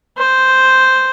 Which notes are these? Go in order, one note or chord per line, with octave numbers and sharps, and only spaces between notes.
C5